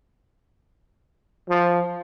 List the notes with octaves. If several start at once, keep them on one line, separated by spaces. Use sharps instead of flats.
F3